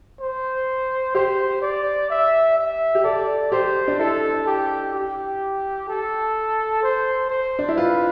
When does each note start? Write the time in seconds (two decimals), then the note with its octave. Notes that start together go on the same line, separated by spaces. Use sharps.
0.20 C5
1.15 G4 C5
1.62 D5
2.10 E5
2.57 E5
2.95 G4
3.04 A4 D5
3.52 G4 C5
3.88 D4
3.99 E4 A4
4.47 G4
4.94 G4
5.88 A4
6.83 C5
7.30 C5
7.59 D4
7.69 E4
7.77 F4 B4